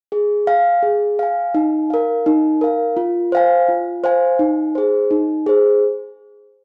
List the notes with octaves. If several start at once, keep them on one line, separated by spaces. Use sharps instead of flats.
G#4
F5 G#5
G#4
F5 G#5
D#4
A#4 F5
D#4
A#4 F5
F4
C5 F5 G#5
F4
C5 F5 G#5
D#4
G#4 C5
D#4
G#4 C5